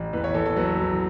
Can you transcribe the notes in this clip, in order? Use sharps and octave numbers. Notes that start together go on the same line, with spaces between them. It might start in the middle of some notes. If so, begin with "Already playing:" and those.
Already playing: A1
E2 B4
C#5
E2 A4
A4
F#3 B4
E2